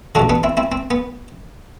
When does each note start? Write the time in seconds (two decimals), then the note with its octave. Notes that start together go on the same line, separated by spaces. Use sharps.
0.15 A1 G2 D3 D4 F#4
0.29 B3 D4
0.43 C4 E4
0.57 C4 E4
0.72 C4
0.91 B3